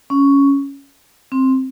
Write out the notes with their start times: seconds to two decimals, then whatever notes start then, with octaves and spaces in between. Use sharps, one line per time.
0.10 C#4
1.32 C4